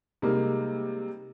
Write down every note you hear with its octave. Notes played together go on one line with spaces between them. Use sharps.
C3 G3 G#3 A#3 D#4